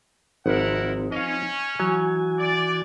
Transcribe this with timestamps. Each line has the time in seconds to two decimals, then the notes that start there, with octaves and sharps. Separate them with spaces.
0.46 G#1 F3 C4 D#4 E4 A#4 F#5
1.12 C#4 D#5 F5
1.80 E3 F#3 F#4 G#5
2.39 D5